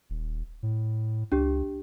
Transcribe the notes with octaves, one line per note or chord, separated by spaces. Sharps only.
D#1
A2
C#2 D4 G4